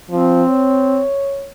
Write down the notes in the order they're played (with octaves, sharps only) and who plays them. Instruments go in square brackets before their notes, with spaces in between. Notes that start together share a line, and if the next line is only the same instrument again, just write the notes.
[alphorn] F3 [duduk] C4
[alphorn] C#5